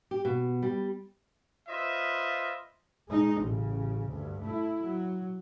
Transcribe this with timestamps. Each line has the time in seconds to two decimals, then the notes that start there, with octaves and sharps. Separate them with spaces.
0.11 G4
0.25 B2
0.62 G3
1.69 F4 B4 C5 D#5 E5
3.09 G#3 D#4
3.42 A1 C#3
4.08 D2 G2
4.42 A3 E4
4.84 F#3